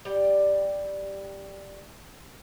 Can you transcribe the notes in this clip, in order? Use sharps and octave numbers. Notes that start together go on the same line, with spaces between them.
G3 D5 G5